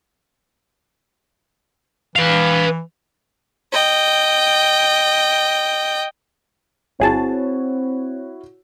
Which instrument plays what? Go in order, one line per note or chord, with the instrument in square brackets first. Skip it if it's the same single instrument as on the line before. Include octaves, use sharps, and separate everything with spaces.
[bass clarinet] E3 [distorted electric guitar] B4 F5
[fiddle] D#5 G5
[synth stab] G1 G#4 A5 [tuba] C4 [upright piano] E4 F#4 C#5